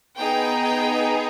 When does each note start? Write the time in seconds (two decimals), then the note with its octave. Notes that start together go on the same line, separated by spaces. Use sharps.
0.17 B3 D#4 G#4 G5
0.63 G5